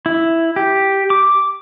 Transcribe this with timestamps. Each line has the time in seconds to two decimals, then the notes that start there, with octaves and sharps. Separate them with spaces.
0.06 E4
0.56 G4
1.10 D6